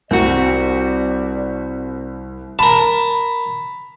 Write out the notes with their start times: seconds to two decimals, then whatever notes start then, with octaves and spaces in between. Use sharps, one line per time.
0.11 C2 C4 F#4 D5
2.59 A#4 A5 B5